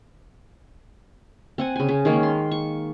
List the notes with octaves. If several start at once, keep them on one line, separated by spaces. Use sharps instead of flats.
C4 F#5 G#5
C#3 G#5
C#3
D#3 G#3 A#3 C#4
C6
C#6